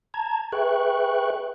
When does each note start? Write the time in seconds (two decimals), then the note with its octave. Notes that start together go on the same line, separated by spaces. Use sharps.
0.14 A5 A#5 G#6
0.52 G#4 B4 E5 G5 C#6 F#6